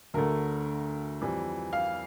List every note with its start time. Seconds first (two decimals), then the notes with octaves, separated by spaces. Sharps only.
0.14 D2 D3 A3 A#4
1.21 F2 E3 G3
1.73 F5